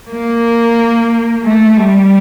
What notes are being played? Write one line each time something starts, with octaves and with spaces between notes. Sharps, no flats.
A#3
A3
G3